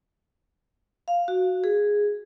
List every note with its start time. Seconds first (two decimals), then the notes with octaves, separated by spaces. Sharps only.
1.08 F5
1.28 F#4
1.64 G#4